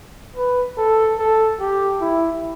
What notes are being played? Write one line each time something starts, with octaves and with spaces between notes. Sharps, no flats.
B4
A4
A4
G4
E4